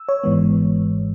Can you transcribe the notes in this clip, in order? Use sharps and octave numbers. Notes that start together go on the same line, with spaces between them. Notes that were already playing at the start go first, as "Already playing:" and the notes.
Already playing: E6
C#5
G#1 G#2 E3 G#3 B3